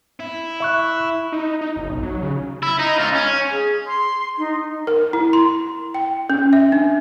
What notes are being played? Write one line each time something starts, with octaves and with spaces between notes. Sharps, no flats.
E4
E5 C#6 F#6
D#4
D#4
F#1
B1
F#3
C#3
E4
D#4
C#2 F4
C#4
G#4
C6
D#4
A#4
E4
C6
G5
C#4
E5
D4